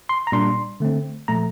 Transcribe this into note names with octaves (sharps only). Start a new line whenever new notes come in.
C6
A#5
A#2 G3 A#3 D4 C6
D3 A3 C4
A#2 F3 A3 A#5